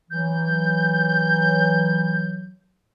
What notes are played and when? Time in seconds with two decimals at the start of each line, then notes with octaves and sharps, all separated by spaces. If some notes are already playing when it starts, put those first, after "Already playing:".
0.11 E3 F#3 G6